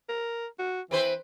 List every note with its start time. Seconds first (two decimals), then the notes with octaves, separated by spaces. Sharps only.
0.09 A#4
0.59 F#4
0.91 E3 C4 B4 C5